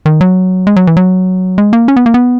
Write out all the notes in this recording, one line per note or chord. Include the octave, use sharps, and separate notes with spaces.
D#3
F#3
G#3
F#3
E3
F#3
G#3
A#3
C#4
B3
A#3
B3